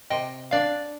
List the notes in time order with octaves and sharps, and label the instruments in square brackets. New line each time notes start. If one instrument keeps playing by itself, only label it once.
[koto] C3 [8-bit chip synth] D#5 G5
[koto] D4 [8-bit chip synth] D5 F5